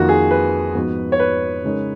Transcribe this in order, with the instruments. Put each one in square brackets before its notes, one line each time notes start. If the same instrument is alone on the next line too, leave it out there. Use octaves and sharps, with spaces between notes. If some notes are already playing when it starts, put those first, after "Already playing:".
Already playing: [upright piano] F2 D#3 A#3 F4 [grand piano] F#4
[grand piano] G#4
B4
[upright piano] G#2 F3 B3 F#4
[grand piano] C#5
B4
[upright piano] C#3 G#3 D#4 A#4 C#5